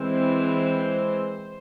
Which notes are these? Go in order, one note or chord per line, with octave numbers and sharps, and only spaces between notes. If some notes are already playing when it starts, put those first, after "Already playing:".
Already playing: E3 G#3 C4 C5